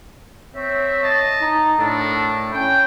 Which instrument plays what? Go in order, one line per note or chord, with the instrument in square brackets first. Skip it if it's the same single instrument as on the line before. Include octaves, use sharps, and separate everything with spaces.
[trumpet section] C4 E5 [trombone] C#5
[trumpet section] D#5 A5
[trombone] D#4
[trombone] A2 [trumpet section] D4 A4 A#4
[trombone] C#4 [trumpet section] G5